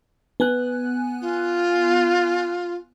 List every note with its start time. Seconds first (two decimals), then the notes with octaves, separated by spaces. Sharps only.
0.40 B3 G#5 F#6
1.21 F4